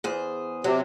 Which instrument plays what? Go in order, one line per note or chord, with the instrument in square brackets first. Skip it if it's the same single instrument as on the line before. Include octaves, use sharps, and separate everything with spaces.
[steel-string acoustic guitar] E2 G#4 C5
[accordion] C3 [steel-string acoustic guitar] F#3